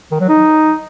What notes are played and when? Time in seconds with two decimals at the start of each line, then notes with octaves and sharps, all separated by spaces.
0.11 D#3
0.20 F#3
0.29 D#4